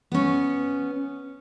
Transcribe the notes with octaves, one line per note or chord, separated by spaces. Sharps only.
B3 C#4